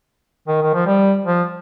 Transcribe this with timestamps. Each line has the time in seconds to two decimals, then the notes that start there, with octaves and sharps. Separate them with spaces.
0.48 D#3
0.62 D#3
0.74 F3
0.86 G3
1.24 F3